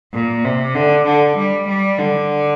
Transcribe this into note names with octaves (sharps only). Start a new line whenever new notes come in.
A#2
C3
D3
D3
G3
G3
D3